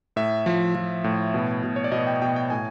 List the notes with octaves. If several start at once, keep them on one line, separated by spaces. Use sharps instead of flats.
A2 E5
F3
F3
A2
B2
B2
C#5
D5
B2 D#5
G5
B2 G5
G5
A2 G#5